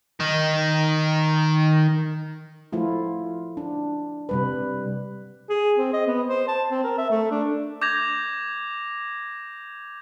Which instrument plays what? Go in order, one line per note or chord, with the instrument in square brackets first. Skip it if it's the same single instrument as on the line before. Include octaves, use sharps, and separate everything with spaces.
[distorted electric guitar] D#3 D#4
[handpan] F3 A3 E4 F4
D4
C3 G3 B4
[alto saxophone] G#4
C4
D#5
B3
C5
A5
C4
A#4
E5
A3
D4
[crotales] D6 G6 G#6 A#6 F7